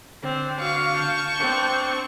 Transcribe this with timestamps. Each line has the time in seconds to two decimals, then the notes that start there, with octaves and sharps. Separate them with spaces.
0.23 D3 C4
0.61 F#4 F5 C#6
0.94 A5 G6
1.40 C4 D4